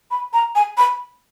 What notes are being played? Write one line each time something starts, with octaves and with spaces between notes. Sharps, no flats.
B5
A#5
G#5
B5